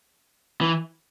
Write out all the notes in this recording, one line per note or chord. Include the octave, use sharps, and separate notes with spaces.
E3